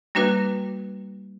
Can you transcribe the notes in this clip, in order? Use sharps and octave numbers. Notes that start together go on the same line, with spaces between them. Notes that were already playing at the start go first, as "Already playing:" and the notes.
G3 A#3 D4 F#4 B4